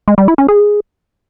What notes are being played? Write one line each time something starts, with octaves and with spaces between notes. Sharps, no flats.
G#3
G3
E4
C#4
G#4